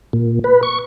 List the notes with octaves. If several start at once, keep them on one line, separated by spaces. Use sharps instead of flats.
A#2
B4
C#6